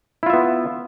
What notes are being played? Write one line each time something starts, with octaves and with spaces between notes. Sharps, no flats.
B3 E4 F4 E5